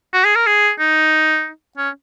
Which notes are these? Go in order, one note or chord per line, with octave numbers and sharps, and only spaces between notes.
F#4
G#4
A#4
G#4
D#4
C#4